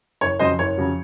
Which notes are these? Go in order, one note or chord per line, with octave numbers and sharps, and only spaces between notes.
F#1 C#5
F2 C#3 F#3 C5 D#5
F#1 C#5
F2 C#3 F#3